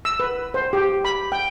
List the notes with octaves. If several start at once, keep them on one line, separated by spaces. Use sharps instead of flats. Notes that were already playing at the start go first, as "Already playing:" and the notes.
E6
B4
C5
G4
B5
G5